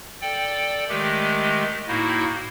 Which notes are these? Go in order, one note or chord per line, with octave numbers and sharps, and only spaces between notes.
A4 D5 G5
D#3 G#3 A3 G4
A2 A#3 D#4 E4 F#4